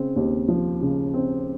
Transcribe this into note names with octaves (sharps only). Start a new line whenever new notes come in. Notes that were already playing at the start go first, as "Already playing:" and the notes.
Already playing: C#3 C4
D#2
F3
C#3
C4